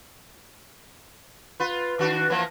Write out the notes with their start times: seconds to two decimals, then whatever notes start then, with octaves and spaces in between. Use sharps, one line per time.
1.60 F4 B4
1.99 D#3 D4 F#4
2.30 E3 F3 A#3